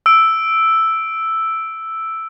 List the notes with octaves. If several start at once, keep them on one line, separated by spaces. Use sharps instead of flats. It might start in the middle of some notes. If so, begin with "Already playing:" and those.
E6 D7